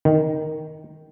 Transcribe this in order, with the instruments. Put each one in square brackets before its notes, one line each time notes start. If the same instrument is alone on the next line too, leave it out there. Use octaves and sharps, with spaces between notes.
[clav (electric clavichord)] D#3